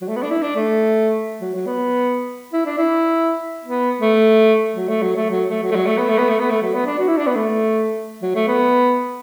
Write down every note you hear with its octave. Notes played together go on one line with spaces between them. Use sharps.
F#3
A3
B3
D4
E4
D4
A3
F#3
F#3
B3
E4
D4
E4
B3
A3
F#3
A3
F#3
A3
F#3
A3
F#3
A3
F#3
A3
B3
A3
B3
A3
B3
A3
F#3
B3
D4
F#4
E4
D4
B3
A3
F#3
A3
B3